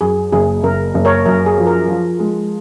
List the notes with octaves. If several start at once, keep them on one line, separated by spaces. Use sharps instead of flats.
F#2 G#4
F#1 G#4
F#1 A#4
F#1
A#4 C#5
F#2 A#4
G#4
F3
A#4
F3
G#3